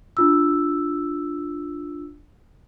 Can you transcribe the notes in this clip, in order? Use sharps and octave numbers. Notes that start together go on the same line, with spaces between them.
D4 F4 E6